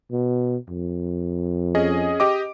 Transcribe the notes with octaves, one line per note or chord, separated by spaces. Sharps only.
B2
F2
C#4 G#4 D#5
G4 D#5 D6